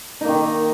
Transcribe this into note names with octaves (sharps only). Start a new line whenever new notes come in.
D#3 A#3 D#4